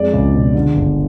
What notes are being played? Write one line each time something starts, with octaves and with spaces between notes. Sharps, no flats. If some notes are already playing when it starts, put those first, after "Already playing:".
Already playing: F2 G#3 D5
C#2
B2
D3
G1